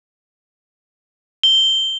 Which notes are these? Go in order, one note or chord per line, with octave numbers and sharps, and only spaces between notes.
G7